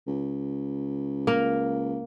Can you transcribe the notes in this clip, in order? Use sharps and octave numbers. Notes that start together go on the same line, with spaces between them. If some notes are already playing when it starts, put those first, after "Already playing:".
C#2
A#3 A#4